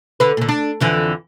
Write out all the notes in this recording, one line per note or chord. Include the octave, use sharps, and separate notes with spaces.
D3 B4
A#2 D3
D4
F2 D3 E3